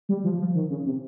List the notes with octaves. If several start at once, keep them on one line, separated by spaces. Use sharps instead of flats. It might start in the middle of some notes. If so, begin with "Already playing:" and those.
G3
F3
F3
D#3
C#3
C3